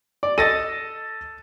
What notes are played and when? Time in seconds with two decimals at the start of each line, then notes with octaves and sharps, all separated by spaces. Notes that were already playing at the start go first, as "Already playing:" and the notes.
0.23 D5
0.38 A4 D#5 A6 A#6 D#7